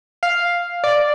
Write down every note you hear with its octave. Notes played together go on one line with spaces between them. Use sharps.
F5
D5